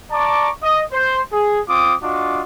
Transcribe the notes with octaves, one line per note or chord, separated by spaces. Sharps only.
D5 A5 A#5 C#6 D6
D#5
C5
G#4
C4 F4 D6 D#6
D4 F4 F#4 D#5 D6